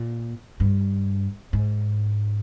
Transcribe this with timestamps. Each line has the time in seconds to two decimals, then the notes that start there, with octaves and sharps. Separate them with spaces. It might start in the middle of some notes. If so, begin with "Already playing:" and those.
Already playing: A#2
0.60 G2
1.53 G#2